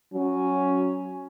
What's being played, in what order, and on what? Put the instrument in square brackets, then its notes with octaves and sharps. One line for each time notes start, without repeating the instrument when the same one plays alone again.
[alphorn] F#3 [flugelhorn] C#4